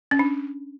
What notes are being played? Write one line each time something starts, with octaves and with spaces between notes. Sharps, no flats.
C#4
D4